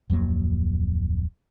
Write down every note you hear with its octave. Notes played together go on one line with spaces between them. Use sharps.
D1 F2 F#3 A#3